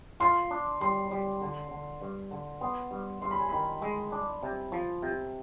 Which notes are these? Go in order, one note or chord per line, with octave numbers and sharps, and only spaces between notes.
F4 C6
D4
G3 C6
G3
D3
D3
G2
D3
B3 C6
G2
G2 C6
B5
G#5
D#3 B5
G#3
D4
C3
F3
C3